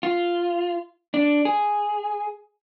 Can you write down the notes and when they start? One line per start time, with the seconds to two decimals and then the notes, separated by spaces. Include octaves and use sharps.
0.03 F4
1.14 D4
1.45 G#4